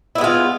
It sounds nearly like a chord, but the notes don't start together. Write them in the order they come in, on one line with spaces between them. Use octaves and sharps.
E4 B3 G#3 F4